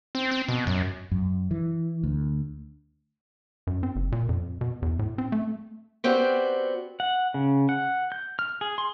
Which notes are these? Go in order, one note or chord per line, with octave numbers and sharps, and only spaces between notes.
C4
C4
B2
F#2
F#2
E3
D2
F#2
C4
F#1
A#2
F2
B2
E2
A2
C4
A3
B3 C4 F#4 G4 D5
F#5
C#3
F#5
G6
F6
G#4
C6